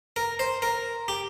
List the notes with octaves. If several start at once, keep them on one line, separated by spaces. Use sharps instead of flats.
A#4
C5
A#4
G4